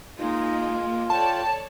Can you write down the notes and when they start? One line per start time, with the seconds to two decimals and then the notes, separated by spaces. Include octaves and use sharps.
0.19 G#3 A#3 D#4 F4
1.10 A4 C#5 D5 G5 A5